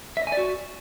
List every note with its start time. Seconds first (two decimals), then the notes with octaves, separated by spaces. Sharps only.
0.17 E5
0.22 D#5
0.27 G#5
0.32 D5
0.37 F#4